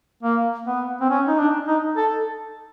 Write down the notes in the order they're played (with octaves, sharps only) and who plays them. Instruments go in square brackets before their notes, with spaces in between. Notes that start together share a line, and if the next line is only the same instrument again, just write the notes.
[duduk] A#3
B3
C4
C#4
D#4
D4
D#4
A4